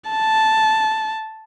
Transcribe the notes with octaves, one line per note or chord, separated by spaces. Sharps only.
A5